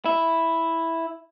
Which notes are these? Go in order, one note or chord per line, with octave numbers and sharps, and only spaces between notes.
E4